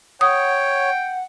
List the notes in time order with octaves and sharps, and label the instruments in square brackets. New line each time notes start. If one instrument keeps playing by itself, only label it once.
[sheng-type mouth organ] C#5 [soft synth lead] F#5 [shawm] G5 [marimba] D#6